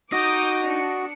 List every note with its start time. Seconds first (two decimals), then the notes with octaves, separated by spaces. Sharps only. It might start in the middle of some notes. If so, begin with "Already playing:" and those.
0.12 D#4 F#4 D#5 D6 D#6 G6
0.66 D4 C#7